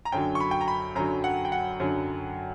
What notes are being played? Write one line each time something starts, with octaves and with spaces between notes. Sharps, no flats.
A#5
F#2 D3 F#3 G5
C#6
B5
G5
A#5
B5
F#2 D3 F#3 A#5
F#5
G5
F#5
F#2 D3 F#3